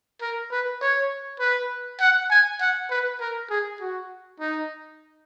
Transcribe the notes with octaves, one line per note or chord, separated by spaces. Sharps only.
A#4
B4
C#5
B4
F#5
G#5
F#5
B4
A#4
G#4
F#4
D#4